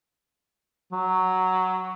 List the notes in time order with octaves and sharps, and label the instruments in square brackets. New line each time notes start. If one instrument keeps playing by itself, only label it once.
[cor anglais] F#3